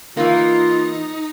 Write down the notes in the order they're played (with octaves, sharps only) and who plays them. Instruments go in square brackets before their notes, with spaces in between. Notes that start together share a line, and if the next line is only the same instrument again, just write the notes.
[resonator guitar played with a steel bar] E3 A#3 [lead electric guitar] D#4 [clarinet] F4